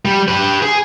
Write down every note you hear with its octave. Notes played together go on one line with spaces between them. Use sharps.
G3
G4 B4
G#4